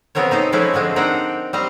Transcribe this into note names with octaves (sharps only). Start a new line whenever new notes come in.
C#3 B3 C4 A#4 C5 C#5
D#4 A4 C5
F3 G#3 A3 C4 C#4 E4
D3 F3 G#3 C4
C4 D4 D#4 A#4 F#5 G5
G3 C4 C5 D#5 A#5